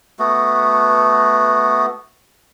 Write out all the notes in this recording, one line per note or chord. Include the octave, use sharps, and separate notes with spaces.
A3 B3 F#4